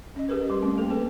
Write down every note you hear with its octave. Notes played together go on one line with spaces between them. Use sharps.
C#4 D#5
G4 G#4 A#4 B4
G3 C6
A3 C4 C#4
A#3 A4
A#3 C#4 G#4 B4